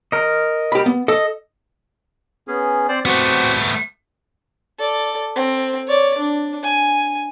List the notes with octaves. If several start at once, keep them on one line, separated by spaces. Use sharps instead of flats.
A#4 D#5
G4 B5
B3
A4 D#5
B3 C#4 G#4
C4 C5 D5
A3 B3 C4 F#4 G4
A4 D5
C4
C#5 D5
D4
G#5